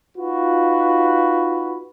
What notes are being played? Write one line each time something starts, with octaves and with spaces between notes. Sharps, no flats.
D#4 F4 F#4 B4